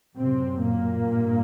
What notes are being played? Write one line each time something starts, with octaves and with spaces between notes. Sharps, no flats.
F#2 C3 C4
A#2 A#3
G2